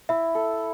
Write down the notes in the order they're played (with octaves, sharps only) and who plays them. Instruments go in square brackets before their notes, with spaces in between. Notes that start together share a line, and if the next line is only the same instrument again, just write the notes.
[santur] E4 [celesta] E5
[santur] A4